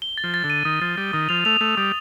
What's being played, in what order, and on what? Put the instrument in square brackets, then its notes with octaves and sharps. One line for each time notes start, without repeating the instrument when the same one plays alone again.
[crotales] G7
A6
[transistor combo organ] F3
[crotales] A6
[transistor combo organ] D3
[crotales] D#7
[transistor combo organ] D#3 [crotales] D#6
[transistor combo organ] F3 [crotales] A6
[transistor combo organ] G3 [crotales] A6
[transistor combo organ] D#3 [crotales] D#6
[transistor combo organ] F3 [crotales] F7
[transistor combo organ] A3 [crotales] F7
[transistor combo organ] A3 [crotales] F7
[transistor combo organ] G3 [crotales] D#6